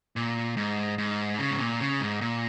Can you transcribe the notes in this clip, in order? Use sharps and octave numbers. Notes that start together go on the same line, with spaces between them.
A#2
G#2
G#2
C#3
G#2
A#2
C#3
G#2
A#2